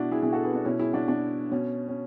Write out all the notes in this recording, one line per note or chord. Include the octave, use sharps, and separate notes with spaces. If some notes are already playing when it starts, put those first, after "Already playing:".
Already playing: B2 D4 E4 F#4
E4 G#4
B2 E4 G#4
F#4 A4
G#4 B4
D4
B2 C#4 E4
E4 G#4
D4 F#4
B2 D4
B2 C#4
C#4